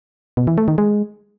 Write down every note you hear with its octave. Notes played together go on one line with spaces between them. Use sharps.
B2
E3
A3
D#3
G#3